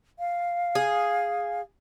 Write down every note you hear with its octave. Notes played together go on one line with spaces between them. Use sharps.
F5
G#4